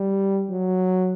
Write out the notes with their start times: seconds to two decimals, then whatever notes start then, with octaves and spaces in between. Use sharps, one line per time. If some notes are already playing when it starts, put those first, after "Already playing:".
Already playing: G3
0.50 F#3